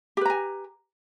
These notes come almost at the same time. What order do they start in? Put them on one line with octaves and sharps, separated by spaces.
G4 B4 A#5 G#5